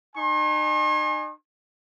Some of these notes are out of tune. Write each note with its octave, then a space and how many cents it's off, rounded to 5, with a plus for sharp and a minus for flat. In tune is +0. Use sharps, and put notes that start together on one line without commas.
D#4 -40 G#5 +0 C6 +45